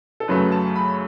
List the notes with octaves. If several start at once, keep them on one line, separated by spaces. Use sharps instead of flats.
A4
F#2 C#3 F#3 A3 B4
A5
B5